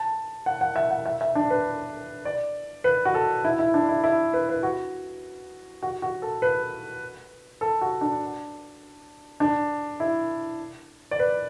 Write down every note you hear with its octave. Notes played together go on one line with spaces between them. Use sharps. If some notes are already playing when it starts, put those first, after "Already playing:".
Already playing: A5
F#5
F#5
E5
F#5
E5
E5
D4
B4
D5
B4
F#4
A4
E4
E4
D4
E4
E4
B4
B4
F#4
F#4
F#4
A4
B4
A4
F#4
D4
D4
E4
D5
B4